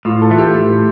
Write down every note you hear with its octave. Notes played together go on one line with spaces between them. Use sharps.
A2 F4
A4
E3 A3
G4
A2